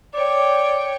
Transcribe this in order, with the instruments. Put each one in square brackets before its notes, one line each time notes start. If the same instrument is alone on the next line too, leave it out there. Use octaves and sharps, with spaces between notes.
[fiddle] C#5 G5 [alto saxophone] D5